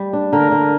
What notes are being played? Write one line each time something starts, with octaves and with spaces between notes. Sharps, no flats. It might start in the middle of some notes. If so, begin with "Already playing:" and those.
Already playing: G3
D4
D3 A#4
D3